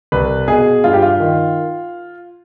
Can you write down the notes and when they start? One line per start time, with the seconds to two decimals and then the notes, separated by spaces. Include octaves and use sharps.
0.12 C2 B4
0.48 B2 G#4
0.84 G2 F4
0.93 G4
1.02 F4
1.20 D#3